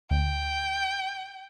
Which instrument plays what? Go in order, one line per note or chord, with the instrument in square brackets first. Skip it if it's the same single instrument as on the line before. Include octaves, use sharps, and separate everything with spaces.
[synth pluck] D2 [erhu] G5